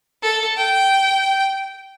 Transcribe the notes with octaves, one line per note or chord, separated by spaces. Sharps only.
A4
G5